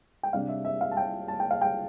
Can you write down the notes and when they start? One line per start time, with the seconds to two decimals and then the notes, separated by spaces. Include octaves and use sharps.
0.23 G5
0.33 C3 G3 D4 F5
0.49 E5
0.65 E5
0.81 F5
0.91 A5
0.97 G5
1.28 A5
1.40 G5
1.51 F5
1.61 G5